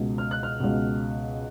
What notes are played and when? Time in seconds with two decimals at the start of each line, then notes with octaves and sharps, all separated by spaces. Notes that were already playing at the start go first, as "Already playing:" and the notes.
Already playing: C#2 B2
0.18 F6
0.31 F#6
0.43 F6
0.60 C#2 B2